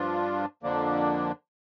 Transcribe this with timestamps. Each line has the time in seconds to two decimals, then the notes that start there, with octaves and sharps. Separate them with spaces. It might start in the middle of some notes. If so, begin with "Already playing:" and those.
Already playing: G2 F3 D4 F4
0.63 F2 D3 F3 A#3 D4